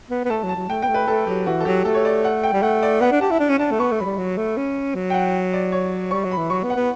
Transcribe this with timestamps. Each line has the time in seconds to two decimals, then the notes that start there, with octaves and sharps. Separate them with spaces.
0.11 B3
0.25 B3
0.30 A3 A5
0.44 F#3
0.49 A5
0.56 F#3
0.69 A3 G5
0.82 B3 G5
0.89 A3
0.94 B4
1.08 A3 A4
1.27 F#3 G4
1.46 E3 F#4
1.60 A4
1.65 F#3 G4
1.85 A3 A4
1.94 C#5
2.05 D5
2.24 F#5
2.43 G5
2.53 G3
2.63 A3 F#5
2.83 D5
3.01 B3 F#5
3.12 D4
3.21 G4 A5
3.31 E4
3.40 D4
3.49 C#4
3.59 D4 A5
3.71 A3
3.79 B3 C#6
3.92 A3
3.99 F#3 B5
4.05 G3
4.18 F#3
4.37 A3
4.57 C#4
4.95 F#3
5.10 G5
5.14 F#5
5.53 D5
5.72 C#5
6.11 G3 C#6
6.24 F#3
6.31 B5
6.37 E3
6.50 F#3 C#6
6.63 B3
6.70 F#5
6.76 B3